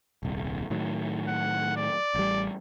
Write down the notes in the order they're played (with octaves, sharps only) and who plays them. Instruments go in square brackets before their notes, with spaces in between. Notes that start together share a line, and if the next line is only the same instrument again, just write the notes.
[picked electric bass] D#1 C2
A2 D#3 F#3
[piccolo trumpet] F#5
D5
[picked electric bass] A1 G3